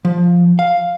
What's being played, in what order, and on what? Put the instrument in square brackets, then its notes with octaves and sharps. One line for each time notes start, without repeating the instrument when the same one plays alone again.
[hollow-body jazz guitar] F3
F5